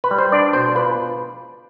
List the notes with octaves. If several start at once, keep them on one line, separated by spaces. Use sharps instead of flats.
B4
G3
C5
D4 D5
B2 C5
F4 B4